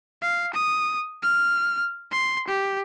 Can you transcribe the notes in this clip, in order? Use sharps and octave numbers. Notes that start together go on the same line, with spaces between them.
F5
D#6
F6
C6
G4